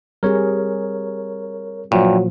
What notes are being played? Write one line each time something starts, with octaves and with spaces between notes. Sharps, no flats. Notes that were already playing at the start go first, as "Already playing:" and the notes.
G3 C4 G#4 A#4 C#5
G2 A#2 F3 F#3